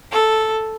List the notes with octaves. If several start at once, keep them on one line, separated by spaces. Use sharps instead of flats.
A4